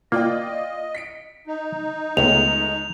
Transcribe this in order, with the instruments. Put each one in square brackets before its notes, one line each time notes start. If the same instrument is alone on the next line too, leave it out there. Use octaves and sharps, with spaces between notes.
[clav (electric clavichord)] A#3 [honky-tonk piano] F4 D5 G5 [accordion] D#5
[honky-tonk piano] B6 C#7 D7
[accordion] D#4
[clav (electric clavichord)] C#2 [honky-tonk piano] G#3 A3 B3 [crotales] F7